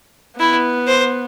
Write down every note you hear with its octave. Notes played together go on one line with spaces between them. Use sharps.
B3 E4
C5